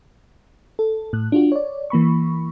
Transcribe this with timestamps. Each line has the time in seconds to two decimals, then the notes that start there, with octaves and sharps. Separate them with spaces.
0.79 A4
1.13 A2 F#6
1.32 D4 F4 F#4
1.52 C#5 D5
1.90 E3 A#3 B5 C#6